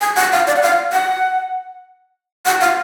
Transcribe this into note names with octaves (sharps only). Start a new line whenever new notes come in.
G#5
F#5
F5
D5
F#5
F5
F#5
F#5
F5